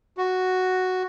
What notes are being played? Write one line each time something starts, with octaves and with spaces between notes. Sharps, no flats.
F#4